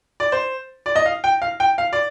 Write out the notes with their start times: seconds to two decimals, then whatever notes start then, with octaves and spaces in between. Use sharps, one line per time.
0.20 D5
0.32 C5
0.86 D5
0.96 D#5
1.06 F5
1.24 G5
1.42 F5
1.60 G5
1.78 F5
1.93 D5